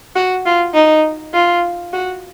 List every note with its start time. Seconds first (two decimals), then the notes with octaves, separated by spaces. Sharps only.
0.16 F#4
0.46 F4
0.74 D#4
1.34 F4
1.93 F#4